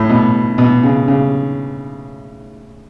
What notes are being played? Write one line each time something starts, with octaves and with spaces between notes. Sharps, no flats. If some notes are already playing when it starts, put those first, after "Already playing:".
Already playing: A2
B2
B2
C#3
C#3